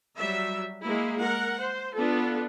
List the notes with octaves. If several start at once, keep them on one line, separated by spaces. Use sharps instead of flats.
F#3 G3 E5
G#3 A#3 E4 G#4
A#4 F#5
C5
B3 D4 F4 A4